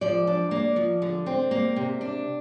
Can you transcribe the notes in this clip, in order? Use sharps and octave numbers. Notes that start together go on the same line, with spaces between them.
F3 D5
D4
A#3
F3
D3
C4
A#3
C3
D4